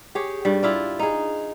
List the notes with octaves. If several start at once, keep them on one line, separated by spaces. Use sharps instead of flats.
G4 G#4 C#5
G2 G3
E4 F4 D5
D#4 G#4